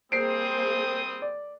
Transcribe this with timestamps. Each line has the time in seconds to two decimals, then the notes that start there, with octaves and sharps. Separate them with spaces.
0.12 G3 A#3 C4 G#4 C5 D#6 C7 D7
1.22 D5